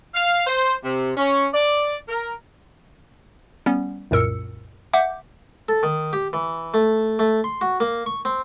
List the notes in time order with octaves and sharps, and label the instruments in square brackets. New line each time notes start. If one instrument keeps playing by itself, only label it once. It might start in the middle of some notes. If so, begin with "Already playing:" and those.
[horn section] F5
C5
C3
C#4
D5
A#4
[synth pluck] G3 B3 C#4
C2 F#2 A#2 A#4 E6 C#7
E5 F#5 D6 G6
[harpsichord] A4
D#3
G4
E3
A3
A3
C6
F#4
A#3
C#6
C4